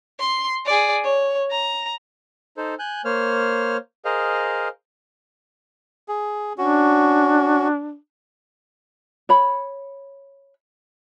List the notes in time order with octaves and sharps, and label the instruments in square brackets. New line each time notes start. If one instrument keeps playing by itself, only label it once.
[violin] C6
G#4 D5
C#5
A#5
[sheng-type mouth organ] D#4 A4 C5
G#5 F#6 G6
A#3 C5 C#5 F6
G#4 A#4 C5 D#5 F5
[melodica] G#4
[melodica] C#4 F#4 [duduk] D4
[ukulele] C#5 B5